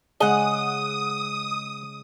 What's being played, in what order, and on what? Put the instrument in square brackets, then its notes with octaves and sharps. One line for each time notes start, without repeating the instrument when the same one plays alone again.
[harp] C#3 G#3 [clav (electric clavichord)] G#4 [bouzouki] D#5 F#5 [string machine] D#6